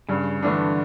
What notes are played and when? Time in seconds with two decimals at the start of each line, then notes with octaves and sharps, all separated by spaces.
0.09 G2 C#3
0.43 D3 E3 A3 D4